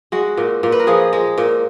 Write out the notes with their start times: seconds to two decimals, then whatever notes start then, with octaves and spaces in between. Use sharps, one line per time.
0.12 G#3 F#4
0.37 A#2
0.63 A#2
0.72 B4
0.80 A#4
0.87 F3 G#4
1.13 G#3
1.38 A#2